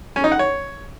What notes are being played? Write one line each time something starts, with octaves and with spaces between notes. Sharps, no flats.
C#4
D#4
F#5
C#5